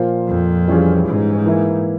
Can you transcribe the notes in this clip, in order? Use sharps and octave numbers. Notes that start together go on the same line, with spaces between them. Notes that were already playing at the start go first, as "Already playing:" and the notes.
Already playing: A#2 F3 A#3 F4 C5
F2
E3 G3 C#4 F4 G#4
G#2
E3 A#3 E4